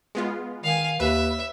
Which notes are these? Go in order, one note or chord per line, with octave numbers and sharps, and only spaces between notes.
G#3 B3 F4
D#3 F5 G#5
D#2 B4 E5